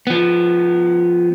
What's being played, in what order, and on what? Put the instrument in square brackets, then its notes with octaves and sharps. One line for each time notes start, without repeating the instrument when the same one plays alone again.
[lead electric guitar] F3 B3